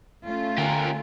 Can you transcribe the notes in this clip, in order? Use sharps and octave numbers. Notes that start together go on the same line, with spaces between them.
A3 C#4 F4
D3 G4 A#4 G#5